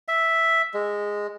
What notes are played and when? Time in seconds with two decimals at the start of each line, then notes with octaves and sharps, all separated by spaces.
0.08 E5
0.74 G#3